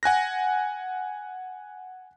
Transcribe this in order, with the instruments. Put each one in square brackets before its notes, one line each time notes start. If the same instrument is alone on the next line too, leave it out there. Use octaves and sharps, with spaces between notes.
[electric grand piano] F#5 G#5 F#6 A#6